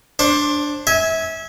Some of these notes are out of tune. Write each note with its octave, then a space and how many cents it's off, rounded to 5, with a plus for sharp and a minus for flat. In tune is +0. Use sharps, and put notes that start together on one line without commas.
D4 +0 C5 +25
E5 -25 G#5 +0